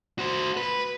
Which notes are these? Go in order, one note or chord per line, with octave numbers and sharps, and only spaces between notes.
F#4 C5
B4